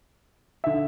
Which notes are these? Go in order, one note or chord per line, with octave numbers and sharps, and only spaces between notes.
D3 E5